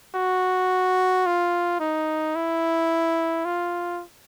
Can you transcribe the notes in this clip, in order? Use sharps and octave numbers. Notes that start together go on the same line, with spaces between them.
F#4
F4
D#4
E4
F4